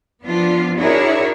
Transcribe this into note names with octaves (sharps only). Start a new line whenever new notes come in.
F3 B3 D4 F4
D4 E4 F#4 G#4 A#4 C#5